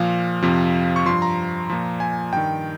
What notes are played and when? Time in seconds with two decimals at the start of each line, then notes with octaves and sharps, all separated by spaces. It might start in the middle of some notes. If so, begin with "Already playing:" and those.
Already playing: A#2 F3 F5
0.43 F2 C3 F3
0.96 C#6
1.06 G2 F3 C6
1.22 A#5
1.70 A#2 F3
2.00 G#5
2.32 G2 D#3 G5